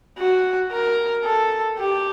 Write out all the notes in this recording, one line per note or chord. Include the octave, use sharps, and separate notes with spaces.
F#4
A#4
A4
G4